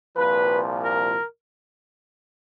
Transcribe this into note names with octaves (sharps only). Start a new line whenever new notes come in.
C2 A#2 F3 B4
A#4